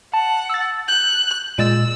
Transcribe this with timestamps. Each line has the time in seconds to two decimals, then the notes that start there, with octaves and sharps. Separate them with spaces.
0.13 F#5 A5
0.50 E6 A6
0.88 F#6 G6
1.58 A#2 G#3 E6 A6